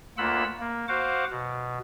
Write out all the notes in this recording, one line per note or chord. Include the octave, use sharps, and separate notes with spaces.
D2 A#3 F4 F#5 B5 E6
A#3
F#4 C5 F5 F#5 D6
B2